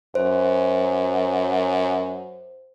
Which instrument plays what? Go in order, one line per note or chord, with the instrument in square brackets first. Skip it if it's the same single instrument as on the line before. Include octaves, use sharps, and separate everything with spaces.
[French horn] F#2 [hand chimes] C5